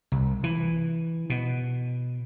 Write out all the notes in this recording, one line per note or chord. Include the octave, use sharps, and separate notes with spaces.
C2
E3
B2